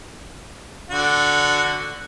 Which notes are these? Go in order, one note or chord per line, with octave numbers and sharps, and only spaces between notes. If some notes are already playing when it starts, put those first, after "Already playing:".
D3 F#4